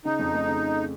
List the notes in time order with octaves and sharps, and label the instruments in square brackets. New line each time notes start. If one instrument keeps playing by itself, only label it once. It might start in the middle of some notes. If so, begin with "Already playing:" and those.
[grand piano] C#3 [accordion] D#4
[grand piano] F2
A3
C#3